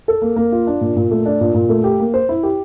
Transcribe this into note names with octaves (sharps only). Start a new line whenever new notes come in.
A4
A#3
A#3
F4
D4
A#2
A#2
A3
D4
A#2
A#2
A3
G4
A#3
C5
E4
G4